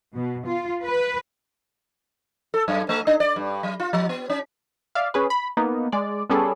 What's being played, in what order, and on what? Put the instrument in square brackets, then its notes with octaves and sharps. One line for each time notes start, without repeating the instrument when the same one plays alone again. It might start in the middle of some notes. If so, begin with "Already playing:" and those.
[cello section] B2
F4
B4
[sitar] A4
F#2
A3
D4
D5
G2
F#3
F4
F3
B3
C#4
[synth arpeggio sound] D5 E5 F5
C#4 G#4 B4
B5
A#3 B3 D#4
G#3 D5
G3 B3 C#4 G#4 A4 D5